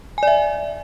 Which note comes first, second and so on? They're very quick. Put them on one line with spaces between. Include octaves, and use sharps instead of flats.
G#5 D5 E5